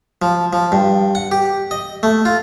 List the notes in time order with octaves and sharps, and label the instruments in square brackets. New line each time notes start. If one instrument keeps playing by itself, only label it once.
[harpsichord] F3
F3
G2
F#5
G4
D#5
A3
F4